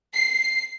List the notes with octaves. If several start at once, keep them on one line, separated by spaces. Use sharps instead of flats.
C7